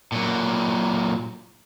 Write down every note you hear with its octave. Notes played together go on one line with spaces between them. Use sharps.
A#2 F#3